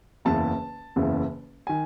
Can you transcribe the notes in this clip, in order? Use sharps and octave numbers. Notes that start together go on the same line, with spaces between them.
F#1 E2 C#3 E3 A5
F#1 E2 C#3 E3
D#3 G#5